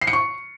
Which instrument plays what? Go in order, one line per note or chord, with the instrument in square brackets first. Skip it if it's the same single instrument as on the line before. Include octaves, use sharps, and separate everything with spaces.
[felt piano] C7
C#7
C#6